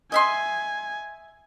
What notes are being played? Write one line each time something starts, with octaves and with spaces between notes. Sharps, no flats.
D#5 E5 G#5 C6